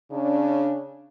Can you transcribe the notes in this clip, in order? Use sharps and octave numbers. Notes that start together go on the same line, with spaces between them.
C#3 C#4 D4